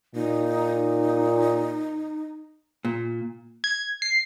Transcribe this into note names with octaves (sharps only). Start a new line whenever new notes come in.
A#2 D#4
A#2
G#6
C7